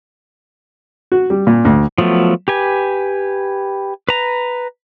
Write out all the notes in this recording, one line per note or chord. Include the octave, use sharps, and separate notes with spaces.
F#4
G3
A#2
D2
F3 F#3 A3 B3
G4 B4 G#5
B4 A#5